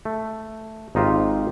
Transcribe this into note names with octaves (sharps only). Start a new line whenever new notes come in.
A3
G#1 D#4 F4 G4 C5